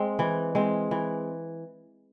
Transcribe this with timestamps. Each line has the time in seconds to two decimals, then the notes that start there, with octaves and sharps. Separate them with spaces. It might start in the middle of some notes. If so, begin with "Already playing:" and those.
Already playing: G#3 C4
0.19 E3
0.55 G#3 C4
0.91 E3